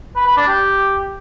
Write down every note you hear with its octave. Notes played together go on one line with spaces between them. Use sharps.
B4
B4
D4
G4